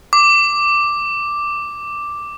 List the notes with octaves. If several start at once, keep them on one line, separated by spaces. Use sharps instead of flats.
D6